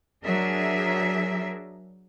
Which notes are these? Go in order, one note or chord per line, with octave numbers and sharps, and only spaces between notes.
F#3 D4 G#4 A#4 E5